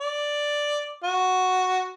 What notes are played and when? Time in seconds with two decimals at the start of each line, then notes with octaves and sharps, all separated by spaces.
0.01 D5
1.04 F#4